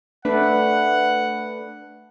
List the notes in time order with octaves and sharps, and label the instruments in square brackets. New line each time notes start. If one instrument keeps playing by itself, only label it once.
[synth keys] A3 D4 B4 [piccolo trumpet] F#5